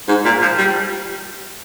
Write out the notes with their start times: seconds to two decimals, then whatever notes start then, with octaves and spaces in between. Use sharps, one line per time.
0.08 G#2
0.25 A#2
0.41 F3
0.58 G3